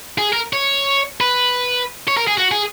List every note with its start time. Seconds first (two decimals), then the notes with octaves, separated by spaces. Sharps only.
0.18 G#4
0.33 A#4
0.53 C#5
1.21 B4
2.08 C#5
2.17 A#4
2.28 G#4
2.37 F#4
2.51 G#4